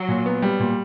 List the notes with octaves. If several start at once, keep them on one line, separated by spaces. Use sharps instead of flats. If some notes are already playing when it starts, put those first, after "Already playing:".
Already playing: F#3
A#2
B3
G3
A#2